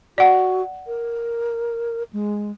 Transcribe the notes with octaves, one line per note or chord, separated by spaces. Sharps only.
F#4 D5 F#5
A#4
G#3